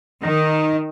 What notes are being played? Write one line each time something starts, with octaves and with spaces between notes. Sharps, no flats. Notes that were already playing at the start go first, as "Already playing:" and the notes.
D#3 D#4